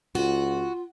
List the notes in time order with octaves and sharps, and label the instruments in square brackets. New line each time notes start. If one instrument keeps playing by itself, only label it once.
[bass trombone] C#2 [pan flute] F4 [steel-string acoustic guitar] F#4